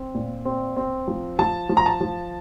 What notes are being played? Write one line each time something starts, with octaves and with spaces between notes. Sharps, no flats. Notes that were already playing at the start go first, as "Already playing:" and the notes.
Already playing: C4
A#2
C4
C4
F3
F3 A5
F3
A#5
A5
F3